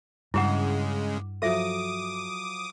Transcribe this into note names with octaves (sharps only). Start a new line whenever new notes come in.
G2 C#3 G#3 E4 G#4 F#5 D6 E7
F3 F#3 A4 E5 D6 D#6